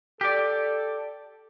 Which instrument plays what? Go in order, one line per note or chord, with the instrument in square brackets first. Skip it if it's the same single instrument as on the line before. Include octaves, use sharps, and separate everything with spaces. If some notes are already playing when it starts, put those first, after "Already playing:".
[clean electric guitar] G4 D5 [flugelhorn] A4